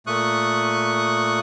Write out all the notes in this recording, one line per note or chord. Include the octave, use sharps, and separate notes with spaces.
A#2 A3 C#6 D#6 F#6